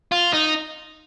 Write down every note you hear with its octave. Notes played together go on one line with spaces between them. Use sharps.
F4
D#4